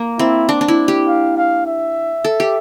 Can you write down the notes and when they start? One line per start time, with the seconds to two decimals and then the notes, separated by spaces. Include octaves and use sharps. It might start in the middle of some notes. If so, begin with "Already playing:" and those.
Already playing: A#3
0.19 C4 E4
0.49 D4
0.61 D4
0.68 E4
0.88 G4
1.07 F5
1.38 F5
1.66 E5
2.25 A4
2.40 G4